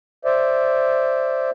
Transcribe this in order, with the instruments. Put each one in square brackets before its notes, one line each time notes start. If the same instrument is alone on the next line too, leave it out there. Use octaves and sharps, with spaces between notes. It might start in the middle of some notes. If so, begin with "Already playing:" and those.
[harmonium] C5 D5 E5